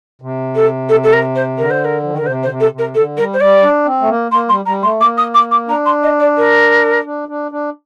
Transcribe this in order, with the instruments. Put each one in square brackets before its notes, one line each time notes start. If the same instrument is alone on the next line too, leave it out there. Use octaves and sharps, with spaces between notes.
[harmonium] C3
[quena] A4
A4
A4
A#4
C5
[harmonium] D3 [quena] A#4
[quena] C5
A#4
[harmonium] F3
D#3
[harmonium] D3 [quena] A#4
[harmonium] C3 [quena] C5
[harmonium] D3 [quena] C5
[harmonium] C3
[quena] A4
[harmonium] C3
[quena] A#4
[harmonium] D3 [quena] A4
[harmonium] G3 [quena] A#4
[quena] C5
[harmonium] G3 [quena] D5
[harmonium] D4
C4
A3
A#3
[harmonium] A#3 [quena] C6
[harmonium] G3 [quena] C6
[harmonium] G3 [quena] A#5
[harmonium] A3 [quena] C6
[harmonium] A#3 [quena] D6
[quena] D#6
D6
D6
[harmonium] D4 [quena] A#5
[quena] C6
D#5
D5
A#4
[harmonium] D4
D4
D4